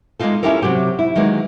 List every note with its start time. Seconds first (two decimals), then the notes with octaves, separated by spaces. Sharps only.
0.19 G#3 A#3 C4 D#4 F4 A4
0.43 C#4 E4 F4 G4 A4 A#4
0.62 C3 F#3 F#4 G4
0.99 E4
1.15 D#3 F#3 G#3 A#3 B4